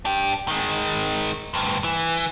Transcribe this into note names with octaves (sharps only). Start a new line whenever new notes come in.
D4 G4
D#3 G#3
D2 G2
E3